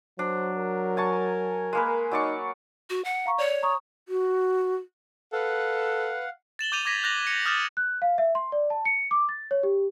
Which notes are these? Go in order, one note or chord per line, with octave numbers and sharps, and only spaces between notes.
F#3 D4 C5
A#4
G#5 A5 C#6
G#3 A#3 B4
F#3 D#4 D5 C#6
F#4
F#5
F5 A#5 C#6
C#5 D5 C#7
A#5 C#6 D#6
F#4
A4 B4 F5 F#5
A6 E7 F#7 G7
D6 G6 D#7 F7
D6 G#6 A#6 B6 D#7
F#6 G6 A#6 F7 F#7
C#7
D#6 F6 G6 A6 E7
F#6
F5
E5
C6
D5
A5
C#7
D6
A6
C#5
G4